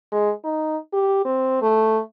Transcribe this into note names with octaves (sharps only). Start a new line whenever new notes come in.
G#3
D#4
G4
C4
A3